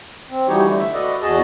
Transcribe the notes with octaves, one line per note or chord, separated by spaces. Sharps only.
C4
E3 G3 D#4 F#4 G4 C#5
D3 G3 A3
E5
F#4 A4 B4 D5 D#5
E2 F#4 G#4 D#5 A5